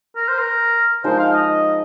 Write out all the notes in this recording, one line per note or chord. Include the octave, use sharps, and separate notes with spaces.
A#4
C5
A#4
F3 G#3 D#4 A#4 C5
F5
D#5